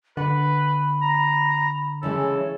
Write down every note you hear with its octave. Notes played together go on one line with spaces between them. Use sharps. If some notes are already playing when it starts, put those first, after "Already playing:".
D3 B4 F#5 B5
A#5
C#3 E3 G#3 A4 C#5